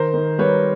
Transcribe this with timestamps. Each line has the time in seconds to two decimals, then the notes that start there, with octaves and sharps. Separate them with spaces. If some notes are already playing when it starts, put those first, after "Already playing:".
Already playing: D#3 A#4 C5
0.14 D#3
0.38 G3 B4 C#5